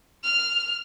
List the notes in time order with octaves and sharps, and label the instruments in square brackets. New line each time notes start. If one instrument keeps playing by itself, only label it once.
[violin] F6